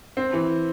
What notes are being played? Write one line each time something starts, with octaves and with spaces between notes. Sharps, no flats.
C4
E3